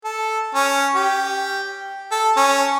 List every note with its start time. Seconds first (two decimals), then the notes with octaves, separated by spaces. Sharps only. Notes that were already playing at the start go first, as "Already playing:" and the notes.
0.05 A4
0.55 C#4
0.95 G4
2.12 A4
2.37 C#4